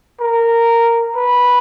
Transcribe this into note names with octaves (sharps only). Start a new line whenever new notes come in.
A#4
B4